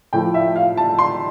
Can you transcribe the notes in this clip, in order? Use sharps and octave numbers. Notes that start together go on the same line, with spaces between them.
A2 F3 A3 G5
E5
F5
A5
C6